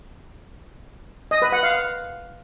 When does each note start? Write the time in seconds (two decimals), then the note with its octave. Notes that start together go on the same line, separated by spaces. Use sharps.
1.31 D#5
1.42 B4
1.52 F#5
1.63 F5